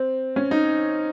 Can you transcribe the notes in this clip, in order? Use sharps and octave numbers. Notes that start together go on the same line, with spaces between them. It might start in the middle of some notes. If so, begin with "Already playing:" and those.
Already playing: C4
C#4
D#4